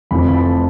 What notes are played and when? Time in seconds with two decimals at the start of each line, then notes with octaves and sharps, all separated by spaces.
0.11 F1 F2 E3 A3 C4 B5
0.29 B5
0.34 A5